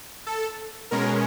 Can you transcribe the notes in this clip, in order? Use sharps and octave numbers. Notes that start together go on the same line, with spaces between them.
A4
B2 G#3 C#4 A#4